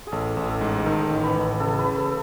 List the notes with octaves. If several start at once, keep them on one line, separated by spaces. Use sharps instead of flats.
G#4
A1 A4
A1
A4
G#2
D#3 A4
A1
B4
A1
C#3 A4
B4
C#3
A4